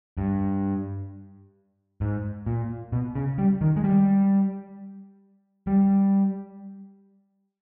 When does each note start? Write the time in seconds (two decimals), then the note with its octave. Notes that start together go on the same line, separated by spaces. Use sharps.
0.18 G2
2.01 G#2
2.46 A#2
2.92 B2
3.15 C#3
3.38 G3
3.61 D#3
3.76 G#3
3.84 G3
5.67 G3